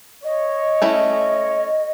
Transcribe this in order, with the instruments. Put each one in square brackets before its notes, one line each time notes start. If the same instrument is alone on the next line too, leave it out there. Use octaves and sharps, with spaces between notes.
[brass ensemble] C#5 [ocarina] D#5
[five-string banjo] A3 C#4 E4